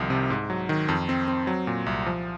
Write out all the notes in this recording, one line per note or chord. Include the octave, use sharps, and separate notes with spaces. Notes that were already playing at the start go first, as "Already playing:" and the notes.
Already playing: C2 D#3 F3
C3
G#2
F#3
D#3
F2
C4
C4
F#3
A#2
C2
F3